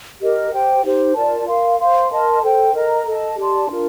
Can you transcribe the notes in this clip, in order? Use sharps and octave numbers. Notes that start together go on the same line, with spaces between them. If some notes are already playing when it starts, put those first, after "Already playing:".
G4 A#4 D#5
G4 C5 G5
D#4 G4 C5
F4 A#4 D5 A5
A#4 F5 C6
C5 F5 C6
A#4 D#5 A5 C6
A4 C5 G5
A#4 D#5 A#5
A4 D#5 A5
G4 D5 A5 C6
D4 F4 A#4